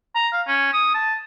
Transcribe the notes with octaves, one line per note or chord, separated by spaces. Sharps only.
A#5
F5
C#4
D#6
A5